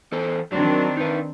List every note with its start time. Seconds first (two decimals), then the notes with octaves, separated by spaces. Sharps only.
0.12 E3 A4 C5
0.52 D#3 F#3 C4 D4
0.97 D#4 B4